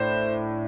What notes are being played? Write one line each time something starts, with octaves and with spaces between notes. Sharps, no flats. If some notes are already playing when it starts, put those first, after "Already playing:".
Already playing: A2 D4 C5